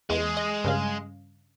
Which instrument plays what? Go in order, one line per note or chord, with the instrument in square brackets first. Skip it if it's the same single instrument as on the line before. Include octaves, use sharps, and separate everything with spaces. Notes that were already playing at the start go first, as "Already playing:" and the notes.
[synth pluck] E2 [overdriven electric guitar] G#3
[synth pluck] D#5
G2 C#3 F5